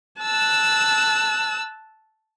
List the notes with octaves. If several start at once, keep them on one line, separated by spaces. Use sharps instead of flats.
A5 E6 F#6